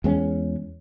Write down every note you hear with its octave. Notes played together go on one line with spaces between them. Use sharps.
E2 G#3 C4 C#4